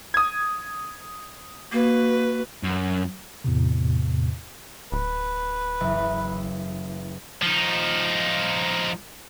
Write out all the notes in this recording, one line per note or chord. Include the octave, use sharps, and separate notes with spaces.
D#6 G#6
A#3 F#4 B4
F#2
E2 A2 C3
D1 B4
F#1 E3
F3 D#4